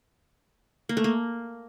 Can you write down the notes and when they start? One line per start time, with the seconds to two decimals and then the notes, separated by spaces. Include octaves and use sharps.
0.89 A#3
0.97 A3
1.04 A#3